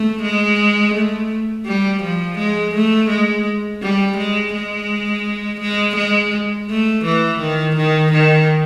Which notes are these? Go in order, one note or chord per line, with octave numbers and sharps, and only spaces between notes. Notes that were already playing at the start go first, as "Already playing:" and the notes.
Already playing: A3
G#3
A3
G3
F3
G#3
A3
G#3
G3
G#3
G#3
G#3
G#3
A3
E3
D#3
D#3
D#3